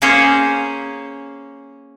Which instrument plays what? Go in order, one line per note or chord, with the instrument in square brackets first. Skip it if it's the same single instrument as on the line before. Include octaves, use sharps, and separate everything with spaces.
[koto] A#3 C#4 G#4 C5 C#5